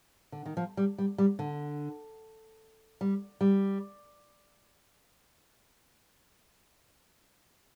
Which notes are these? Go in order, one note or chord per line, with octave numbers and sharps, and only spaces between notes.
D3
D#3
F3
G3
G3
G3
D3
G3
G3